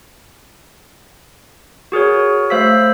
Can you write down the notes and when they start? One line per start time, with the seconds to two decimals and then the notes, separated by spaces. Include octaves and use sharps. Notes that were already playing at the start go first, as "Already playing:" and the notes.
1.92 F#4 G#4 A#4 C#5
2.50 A3 C5 F5 E6 B6